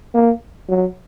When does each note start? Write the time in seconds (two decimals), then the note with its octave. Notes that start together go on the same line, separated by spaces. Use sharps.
0.14 A#3
0.69 F#3